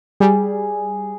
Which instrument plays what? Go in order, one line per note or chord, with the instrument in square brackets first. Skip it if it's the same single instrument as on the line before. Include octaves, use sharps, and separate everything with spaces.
[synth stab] G3 [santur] G#4